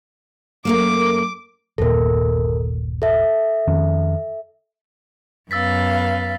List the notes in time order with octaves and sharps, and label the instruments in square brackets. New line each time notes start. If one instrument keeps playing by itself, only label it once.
[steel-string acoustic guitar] F#2 A3 A#3 [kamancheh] D6
[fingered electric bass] G1 D#2 A#2 [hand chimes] A4 A#4
[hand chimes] A4 E5
[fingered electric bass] F2 D#3 C#4
[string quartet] F#2 B3 F5 [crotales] E6 A6 B6